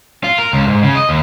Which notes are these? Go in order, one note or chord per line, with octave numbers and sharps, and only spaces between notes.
F4
A#4
C#2
G#2
C#3
D#5
D#2